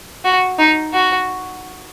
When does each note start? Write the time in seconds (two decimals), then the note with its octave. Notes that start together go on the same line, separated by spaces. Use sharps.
0.24 F#4
0.58 D#4
0.93 F#4